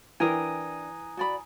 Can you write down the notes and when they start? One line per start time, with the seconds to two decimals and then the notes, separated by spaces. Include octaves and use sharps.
0.20 E3 D4 A#4 G5 G#5 A#5 D#6
1.17 F#4 D5 B5